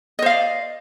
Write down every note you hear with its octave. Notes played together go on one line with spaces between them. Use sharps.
C5 D5 D#5 F5